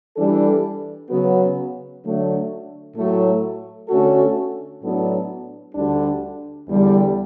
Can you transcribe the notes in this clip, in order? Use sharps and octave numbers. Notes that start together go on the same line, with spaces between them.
E3 G3 D4 A4
C#3 F#3 B3 F#4 B4
D3 F#3 A3 D4
A2 F#3 A3
D3 A3 C#4 F#4 A4
A2 F#3 B3 D4 A4
D2 D3 G3 D4
E2 D3 G3